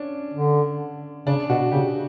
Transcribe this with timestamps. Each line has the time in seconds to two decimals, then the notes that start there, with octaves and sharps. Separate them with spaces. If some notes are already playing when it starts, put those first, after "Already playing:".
Already playing: C#4 D4
0.34 D3
1.27 C#3 D4
1.49 B2 F#4
1.72 C#3 G4